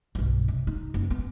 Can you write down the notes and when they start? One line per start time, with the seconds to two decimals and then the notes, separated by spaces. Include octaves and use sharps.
0.15 B1 G2
0.48 C3
0.67 D#4
0.94 F#1
1.10 B3